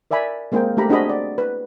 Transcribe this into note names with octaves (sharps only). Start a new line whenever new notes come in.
A#4 D5 E5 G#5 B5
G#3 A#3 C4 G#4 A#4 G5
A3 D4 G4 A#5 B5
C4 D4 F#4 G#4 D#5 B5
D5
B4